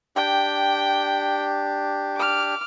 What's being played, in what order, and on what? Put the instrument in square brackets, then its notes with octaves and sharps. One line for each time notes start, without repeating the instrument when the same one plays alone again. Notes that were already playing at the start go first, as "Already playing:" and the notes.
[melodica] D4 G4 [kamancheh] G5
[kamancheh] D6 F6